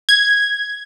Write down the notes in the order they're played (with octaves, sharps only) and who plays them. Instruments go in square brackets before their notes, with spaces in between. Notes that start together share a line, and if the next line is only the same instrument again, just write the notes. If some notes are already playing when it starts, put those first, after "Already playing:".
[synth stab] G#6